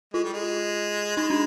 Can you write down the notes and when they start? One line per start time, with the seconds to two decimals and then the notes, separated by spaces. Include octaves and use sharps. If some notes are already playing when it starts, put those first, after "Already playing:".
0.14 G#3 F4
0.24 G3
0.33 G#3
1.17 G#3 D#4
1.30 D4